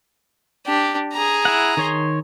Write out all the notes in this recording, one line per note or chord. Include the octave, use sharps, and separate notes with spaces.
D4 G4
G#4 A#5
E4 F#5
D#3 C#5 C6